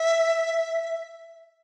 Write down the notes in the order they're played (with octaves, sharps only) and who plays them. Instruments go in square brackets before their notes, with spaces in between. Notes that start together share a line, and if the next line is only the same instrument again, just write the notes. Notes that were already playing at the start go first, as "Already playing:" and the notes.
Already playing: [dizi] E5